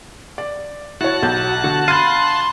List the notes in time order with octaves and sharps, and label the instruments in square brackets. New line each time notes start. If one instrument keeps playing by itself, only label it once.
[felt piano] D5
[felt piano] E4 C#5 [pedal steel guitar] F#4 [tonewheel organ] A5 F#6
[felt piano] B1 G6
[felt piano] D3 [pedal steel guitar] F#4
[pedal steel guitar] F5 B5 [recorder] C6 [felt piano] A6 D#7